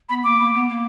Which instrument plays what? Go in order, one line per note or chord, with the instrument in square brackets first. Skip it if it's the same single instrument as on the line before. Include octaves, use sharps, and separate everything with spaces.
[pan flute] B3 [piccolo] B5
[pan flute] A#3 [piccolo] D6
[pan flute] A#3
B3
A#3